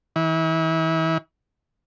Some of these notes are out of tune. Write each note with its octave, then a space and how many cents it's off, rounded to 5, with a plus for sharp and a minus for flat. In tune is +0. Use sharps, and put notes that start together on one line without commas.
E3 -35